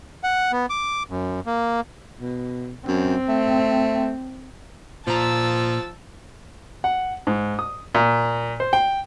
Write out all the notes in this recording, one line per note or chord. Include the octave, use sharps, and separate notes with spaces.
F#5
B3
D6
F#2
A#3
B2
F#2 C4
A3
A#2 F3 A5 A#5 E6
F#5
G#2
D#6
A#2
C5
G5